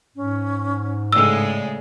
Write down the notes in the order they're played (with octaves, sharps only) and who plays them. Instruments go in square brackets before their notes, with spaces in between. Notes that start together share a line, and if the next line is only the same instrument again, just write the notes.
[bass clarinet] G#2 [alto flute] C#4
[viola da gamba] A2 C#3 G#3 [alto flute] D5 [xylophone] E6